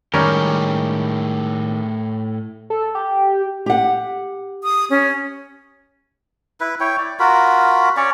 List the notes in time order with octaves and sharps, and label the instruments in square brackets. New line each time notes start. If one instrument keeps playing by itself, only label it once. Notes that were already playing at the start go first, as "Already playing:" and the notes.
[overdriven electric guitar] A2 G4 [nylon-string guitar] D#3 G#3 [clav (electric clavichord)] G3 C#4 A#4
[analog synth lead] A4
G4
[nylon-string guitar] G4 F#5
[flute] D#6
C#4
[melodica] E4 B4
E4 C#5 G5
D5
F4 F#4 A#4 B5
C#4 C#5 D5